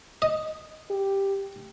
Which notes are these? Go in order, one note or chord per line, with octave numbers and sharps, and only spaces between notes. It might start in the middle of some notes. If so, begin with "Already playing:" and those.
D#5
G4